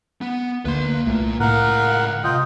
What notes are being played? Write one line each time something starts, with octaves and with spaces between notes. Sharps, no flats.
B3
D2 A#3 B4 C6
C2 A#2 A3 A#3
C#2 A2 A#4 F5 F#5
C3 F4 D#5 G5